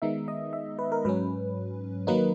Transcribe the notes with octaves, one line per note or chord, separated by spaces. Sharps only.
D#3 G#3 B3 D#4 E5
D#5
E5
B4
A#4
G#2 F#3 C#4 B4
D#3 F#3 A#3 D#4 B4